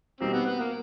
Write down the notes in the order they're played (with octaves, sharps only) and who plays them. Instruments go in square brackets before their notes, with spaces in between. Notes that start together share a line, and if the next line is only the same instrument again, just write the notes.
[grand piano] B2 G3 A#3 D#4 G4 [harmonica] C4
[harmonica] B3
B3
A#3